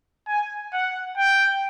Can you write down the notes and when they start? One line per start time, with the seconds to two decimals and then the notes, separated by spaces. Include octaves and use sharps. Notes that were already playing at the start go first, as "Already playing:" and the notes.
0.28 G#5
0.73 F#5
1.17 G5